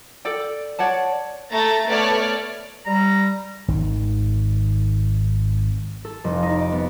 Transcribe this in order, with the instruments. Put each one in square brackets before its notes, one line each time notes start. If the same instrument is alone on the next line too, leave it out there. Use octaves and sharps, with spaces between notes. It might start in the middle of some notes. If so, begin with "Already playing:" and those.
[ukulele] A4 D5 G5
C#5 D5 F#5 A5
[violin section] A3 A#5 A6
A3 B3 C#5 D5 A5 F6
[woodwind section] G3 [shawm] A#5
[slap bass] G#1 D#3
[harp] A4
F1
D#4
D5
B3